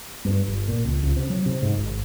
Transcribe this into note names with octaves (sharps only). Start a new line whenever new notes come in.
G2
G1
A#2
C#2
C#2
C3
F#3
C3
G#2
G#1